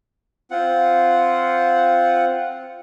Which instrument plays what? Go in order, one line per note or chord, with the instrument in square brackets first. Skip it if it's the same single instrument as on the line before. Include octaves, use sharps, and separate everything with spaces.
[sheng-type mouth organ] C4 F4 F#5